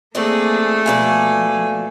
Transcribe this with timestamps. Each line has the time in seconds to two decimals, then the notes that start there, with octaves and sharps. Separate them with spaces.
0.15 E2 A3 A#3 C4 G#4 A4 D5
0.86 B2 F3 A#3 D5 G#5